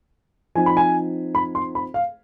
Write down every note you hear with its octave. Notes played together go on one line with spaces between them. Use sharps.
F3 C4 D#4 G#5
B5
G#5
B5
C6
B5
F5